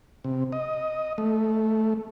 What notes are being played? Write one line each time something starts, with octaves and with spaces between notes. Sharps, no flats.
C3
D#5
A3